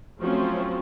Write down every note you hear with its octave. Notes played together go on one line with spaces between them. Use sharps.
F3 F#3 A3 C4 C#4 F4